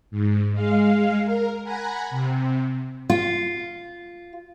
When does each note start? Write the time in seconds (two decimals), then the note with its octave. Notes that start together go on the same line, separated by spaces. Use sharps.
0.11 G#2
0.52 G#3 F5
1.25 A#4
1.63 F#5 G#5 A#5 B5
2.10 C3
3.10 F4